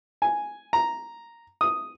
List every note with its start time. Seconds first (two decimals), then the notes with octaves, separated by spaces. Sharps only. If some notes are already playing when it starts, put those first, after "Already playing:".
0.22 G#5
0.73 A#5
1.61 D#6